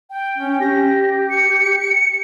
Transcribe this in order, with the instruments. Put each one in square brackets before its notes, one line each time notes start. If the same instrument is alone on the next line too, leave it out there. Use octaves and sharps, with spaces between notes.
[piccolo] G5
[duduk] C#4
[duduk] G4 [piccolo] A#6
[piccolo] C#7